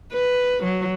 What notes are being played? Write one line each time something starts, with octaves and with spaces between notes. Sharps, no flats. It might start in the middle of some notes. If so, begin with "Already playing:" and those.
B4
F#3